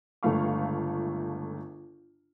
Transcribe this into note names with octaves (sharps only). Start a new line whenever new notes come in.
G1 C#2 A3 F5 C#6